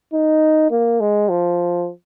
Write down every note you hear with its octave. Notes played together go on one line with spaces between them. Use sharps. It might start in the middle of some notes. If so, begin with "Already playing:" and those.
D#4
A#3
G#3
F3